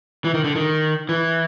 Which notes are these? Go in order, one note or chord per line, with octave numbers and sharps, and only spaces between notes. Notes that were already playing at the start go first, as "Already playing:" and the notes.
E3
D#3
D3
D#3
E3